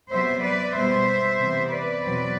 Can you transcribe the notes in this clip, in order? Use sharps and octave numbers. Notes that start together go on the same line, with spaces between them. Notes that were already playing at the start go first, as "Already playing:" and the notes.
C3 F#3 B3 C5 E5
B4 D5
B2 G3 B3 C5 E5
C3 E3 B3
B4 D5
E2 B2 F#3 C4